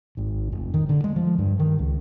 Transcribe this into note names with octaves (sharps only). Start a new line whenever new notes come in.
G#1
F1
D#3
D3
G#3
F3
G2
D#3
C#2